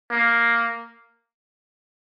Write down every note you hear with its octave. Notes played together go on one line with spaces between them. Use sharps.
A#3